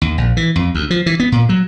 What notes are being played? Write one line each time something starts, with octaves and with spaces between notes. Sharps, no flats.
D#2
A#1
E3
F2
D2
F3
E3
B3
A#2
F#3